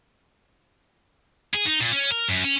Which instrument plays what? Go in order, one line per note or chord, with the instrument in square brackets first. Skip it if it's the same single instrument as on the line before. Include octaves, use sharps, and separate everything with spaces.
[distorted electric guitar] G#4
D#4
A#2
C#4
A#4
F#2
C#4